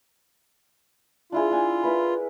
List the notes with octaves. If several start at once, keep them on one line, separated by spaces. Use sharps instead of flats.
D4 E4 F4 G#4
D4 G#5
E4 A#4 B4